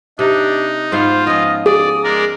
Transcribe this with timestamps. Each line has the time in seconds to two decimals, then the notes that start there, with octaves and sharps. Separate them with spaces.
0.19 C3 D4 D#4
0.92 G#2 B3 F4 C5 F5
1.27 F3 C#4 D#5
1.66 G#4 D5 D#6
2.04 G#3 A#4 D5 A#5